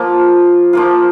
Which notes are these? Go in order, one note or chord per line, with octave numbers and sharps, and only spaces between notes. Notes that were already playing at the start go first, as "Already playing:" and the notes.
Already playing: F3 A#3 F4
F3 A#3 F4